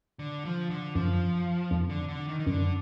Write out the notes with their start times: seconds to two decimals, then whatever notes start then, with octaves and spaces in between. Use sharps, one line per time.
0.19 D3
0.45 F3
0.70 D3
0.95 F#2 F3
1.71 F2
1.90 D3
2.08 D3
2.28 D#3
2.39 D#3
2.46 F#2 D3